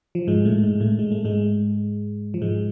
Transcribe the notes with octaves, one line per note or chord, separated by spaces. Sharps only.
F3
G#2 G#3
A2 A3
G#2 G#3
A2 A3
G#3
A3
G#2 G#3
F3
G#2 G#3